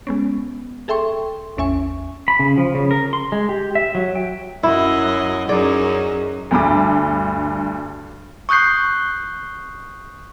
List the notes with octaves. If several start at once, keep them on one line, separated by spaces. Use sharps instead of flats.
G#3 B3 C#4
G#4 A4 E5 G5 C6 C#6
A1 E2 C#4 E5 G#5 C#6
B5
C#3
F3
C#3
A#4
C6
G#3
G4
E5
F#3
G5
F#2 F#3 E4 D#5
F#2 C#4 D#4 G#4 D5
D2 G2 B5 D6
C#6 D#6 F#6 G6 C7